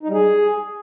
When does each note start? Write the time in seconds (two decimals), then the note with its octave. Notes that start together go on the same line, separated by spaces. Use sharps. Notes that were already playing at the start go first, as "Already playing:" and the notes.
0.03 D#4
0.08 G3
0.14 G#4